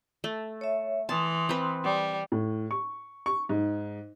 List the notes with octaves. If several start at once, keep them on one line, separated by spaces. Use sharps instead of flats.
A3
C#5 E5
E3 A5 C6 D#6
C4 B4
G3
A2
C#6
C#6
G#2